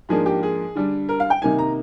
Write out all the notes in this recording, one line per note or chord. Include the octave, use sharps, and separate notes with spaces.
G#2 F3 A#3 D4 G#4
G4
G#4
D3 G3 D4
A#4
F5
G5
C3 D#3 A#3 D#4 G#5
A#5